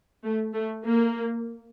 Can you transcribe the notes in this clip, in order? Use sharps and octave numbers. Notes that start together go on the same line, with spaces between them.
A3
A3
A#3